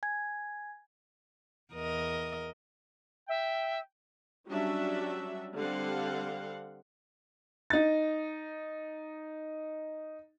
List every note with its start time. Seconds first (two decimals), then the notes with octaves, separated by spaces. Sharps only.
0.03 G#5 G#6
1.73 E2 A#4 D#5
3.28 E5 G5
4.47 F#3 G3 C#4 D4 F#4 E5
5.56 D3 G3 C4 F5 F#5
7.70 D#4 A6